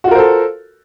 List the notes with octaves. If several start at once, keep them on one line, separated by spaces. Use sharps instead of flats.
F4 F#4 A4 A#4 C5